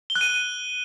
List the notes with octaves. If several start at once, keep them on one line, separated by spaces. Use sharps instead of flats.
G7
F#6
D#7